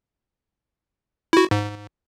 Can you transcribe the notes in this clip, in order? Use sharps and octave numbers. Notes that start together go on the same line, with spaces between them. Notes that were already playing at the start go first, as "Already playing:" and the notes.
E4 F#4
G#2